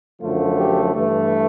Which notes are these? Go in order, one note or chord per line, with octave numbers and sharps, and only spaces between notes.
F#2 D3 F3 A3 F4
G4
G2 E3 A3